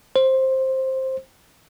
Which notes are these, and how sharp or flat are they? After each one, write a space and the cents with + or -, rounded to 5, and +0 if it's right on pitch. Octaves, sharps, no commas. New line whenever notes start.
C5 +10